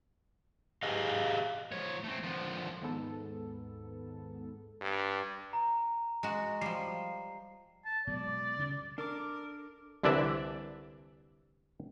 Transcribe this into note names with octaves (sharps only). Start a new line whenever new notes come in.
G4 G#4 D#5 F5
F3 C#5
A3 C4
D3 F3
D#2 G#2 B3 A4
G2
A#5
G#3 F#4
F3 G3 C7
A5
B2 F#3 G#3 D5
D2 C#3 G3
D4 A4 A#4 D6
C2 D3 E3 D4 D5 E5